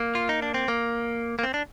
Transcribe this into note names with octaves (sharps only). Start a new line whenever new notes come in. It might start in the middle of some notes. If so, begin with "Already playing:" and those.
Already playing: A#3
F4
D#4
D4
C4
A#3
A#3
C4
D4